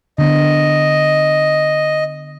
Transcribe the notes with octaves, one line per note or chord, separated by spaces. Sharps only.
D3 B3 D#5